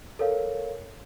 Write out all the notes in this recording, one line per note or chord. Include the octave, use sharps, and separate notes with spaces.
A4 A#4 C#5 F5